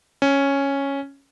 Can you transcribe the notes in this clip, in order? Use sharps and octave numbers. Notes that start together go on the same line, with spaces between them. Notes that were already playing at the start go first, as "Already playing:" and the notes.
C#4